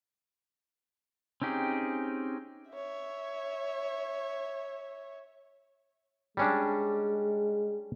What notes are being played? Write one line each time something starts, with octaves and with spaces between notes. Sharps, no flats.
C4 C#4 D#4 G4 G#4
C#5 E5
G3 G#3 C#4 D4